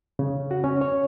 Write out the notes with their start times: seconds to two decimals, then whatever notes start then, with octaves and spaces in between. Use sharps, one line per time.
0.19 C#3
0.51 F#4
0.64 C#4
0.81 C#5